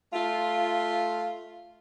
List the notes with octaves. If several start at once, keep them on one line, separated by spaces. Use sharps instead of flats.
A3 F4